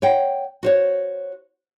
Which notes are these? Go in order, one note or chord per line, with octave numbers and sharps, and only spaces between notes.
C#5 F#5 G5
F#4 C5 C#5